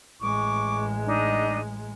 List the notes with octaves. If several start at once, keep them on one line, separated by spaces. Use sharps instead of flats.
A1 G#3 C#6 D6
D4 D#4 D#5